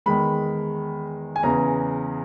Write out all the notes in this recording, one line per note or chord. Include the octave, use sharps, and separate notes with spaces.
E2 D#3 G#3 B5
G#5
E2 C#3 E3 A#5